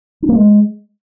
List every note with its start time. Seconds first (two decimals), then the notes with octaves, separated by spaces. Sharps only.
0.22 D4
0.29 A#3
0.35 G#3